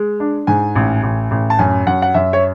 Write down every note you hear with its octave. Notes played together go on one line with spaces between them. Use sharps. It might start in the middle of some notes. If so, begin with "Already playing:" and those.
Already playing: G#3
D4
G#2 G#5
A1
A1
A1
A5
F#2 G#5
F#2 F#5
F#5
F#2 E5
C#5